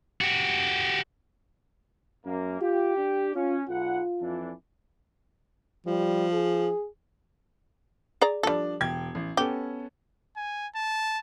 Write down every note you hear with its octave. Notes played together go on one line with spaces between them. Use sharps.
F#4 G4
F#2 A#3
F4 G4
D4
C#4 F4
B1 F4 F#5
F2 E3 D4
F3 G3
G#4
G#4 D5 A#5
F3 G3 D4 A4 D5
E1 G5 G#6
A1
B3 C#4 G4 A4
G#5
A5